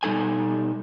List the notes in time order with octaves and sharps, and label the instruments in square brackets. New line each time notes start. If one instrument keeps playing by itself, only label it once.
[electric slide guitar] B2 G3 D#4 A4 G#5